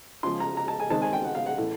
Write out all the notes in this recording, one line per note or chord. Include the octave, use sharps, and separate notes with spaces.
C#3 F3 G#3 C6
A#5
A#5
A5
G#5
D#3 G#3 C4 A5
G#5
G5
F#5
F5
F#5
A2 E3 A3